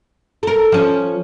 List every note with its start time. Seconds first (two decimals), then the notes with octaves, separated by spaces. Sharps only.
0.43 A4 A#4
0.72 F3 C#4